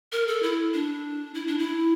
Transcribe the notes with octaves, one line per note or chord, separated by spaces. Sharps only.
A#4
A4
E4
D4
E4
D4
E4